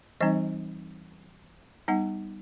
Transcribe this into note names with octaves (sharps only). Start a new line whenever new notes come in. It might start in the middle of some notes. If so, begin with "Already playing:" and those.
E3 G3 C4 D#4 D#5
G3 B3 D#4 F#5